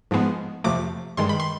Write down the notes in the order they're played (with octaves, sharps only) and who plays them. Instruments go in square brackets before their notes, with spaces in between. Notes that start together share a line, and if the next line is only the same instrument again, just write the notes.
[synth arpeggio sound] G#2 F3 G#3 B3
F2 C3 F3 A3 D6
G2 D#3 G#3 C6
B5
C6